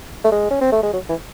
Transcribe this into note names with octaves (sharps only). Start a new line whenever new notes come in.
A3
G#3
C#4
C4
A3
G#3
F#3
E3